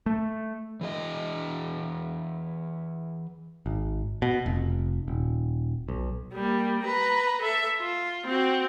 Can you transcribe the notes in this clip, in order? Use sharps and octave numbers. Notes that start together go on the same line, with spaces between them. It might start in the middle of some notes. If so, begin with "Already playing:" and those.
A3
E3 G#4 D#5
G#1
B2
F1
D#1
B1
G3 A#3
B4 A#5
A4 E5
F4
C4 F#4